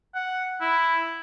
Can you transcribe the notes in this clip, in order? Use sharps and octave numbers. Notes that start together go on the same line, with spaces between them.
F#5
E4